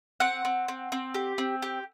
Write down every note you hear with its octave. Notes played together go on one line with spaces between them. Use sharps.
C4 F#5
C4
C4
C4
G4
C4
G4